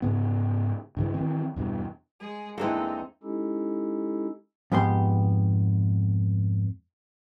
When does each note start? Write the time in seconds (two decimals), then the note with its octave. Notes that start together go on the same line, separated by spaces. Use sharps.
0.02 G#2 C#3 B3
0.97 G2 C#3 E3
1.14 D#3 E3 C4
1.56 E2 G2 B2
2.18 G#3 G#4
2.58 E2 E3 G#3 A#3 C4 D4 D#4 A4
3.23 G#3 C#4 D#4 E4 G4 A4
4.72 F2 G#2 B3 G4 C6